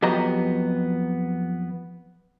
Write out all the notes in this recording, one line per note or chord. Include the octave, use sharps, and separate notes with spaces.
F2 F#3 B3 G4 D#5 A#5